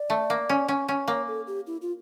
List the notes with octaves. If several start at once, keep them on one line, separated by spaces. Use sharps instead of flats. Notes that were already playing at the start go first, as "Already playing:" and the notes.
Already playing: D5
A3
A#3
C#4
C#4
C#4
A#3 C#5
A4
G4
E4
F4